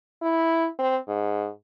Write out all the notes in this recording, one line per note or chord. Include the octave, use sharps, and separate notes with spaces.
E4
C4
G#2